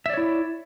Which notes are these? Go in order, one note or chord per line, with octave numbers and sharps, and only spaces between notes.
E4 C#5 D5 E5